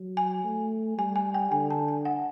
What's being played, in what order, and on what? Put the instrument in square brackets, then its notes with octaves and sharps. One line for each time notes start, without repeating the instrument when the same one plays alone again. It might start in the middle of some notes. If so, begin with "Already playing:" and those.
Already playing: [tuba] F#3
[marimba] G#5
[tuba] A3
[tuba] G3 [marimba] G#5
[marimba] G#5
G5
[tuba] D3 [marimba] G#5
[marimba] A5
G#5
F#5